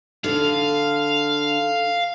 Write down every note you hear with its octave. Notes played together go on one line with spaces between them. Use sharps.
D3 F5